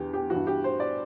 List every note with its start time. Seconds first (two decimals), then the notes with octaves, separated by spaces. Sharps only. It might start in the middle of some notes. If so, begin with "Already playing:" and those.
Already playing: E2 D3 G4
0.14 G4
0.30 G2 E3 F#4
0.47 G4
0.64 C5
0.80 D5